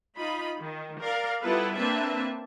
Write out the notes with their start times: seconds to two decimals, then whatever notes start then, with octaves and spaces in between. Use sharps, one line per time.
0.18 D#4 F4 B5
0.57 D#3
1.00 A#4 D5 F5
1.42 G3 B3 E4 F4 A4 B4
1.76 A#3 C4 D4 B4 E5 A5